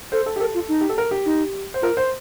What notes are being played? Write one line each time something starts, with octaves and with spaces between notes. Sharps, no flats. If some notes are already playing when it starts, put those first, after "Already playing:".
A4 C5
A4
G4
A4 A#4
F4
D#4
G4
A4
A#4
G4
D#4
C5
F4 A#4
C5